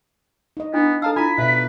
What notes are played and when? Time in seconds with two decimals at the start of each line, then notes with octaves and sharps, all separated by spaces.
0.57 D#4 D#5
0.74 B3 D4 E4
1.02 A4 F5 A5 A#5 E6
1.16 E4 F4 G#5 A#5 B5 B6
1.38 B2 B4 D5 E5